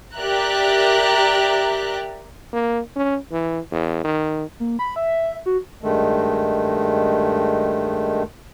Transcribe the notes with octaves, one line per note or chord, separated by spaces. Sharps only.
G4 A#4 D5 E5 A#5 F#6
A#3
C#4
E3
E2
D#3
A#3
B5
E5
F#4
G2 D#3 G#3 A3